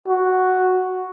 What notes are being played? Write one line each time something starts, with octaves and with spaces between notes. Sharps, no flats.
F#4